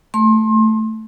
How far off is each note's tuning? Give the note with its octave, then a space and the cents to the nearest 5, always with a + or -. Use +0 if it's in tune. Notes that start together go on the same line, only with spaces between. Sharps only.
A3 +0 C6 +30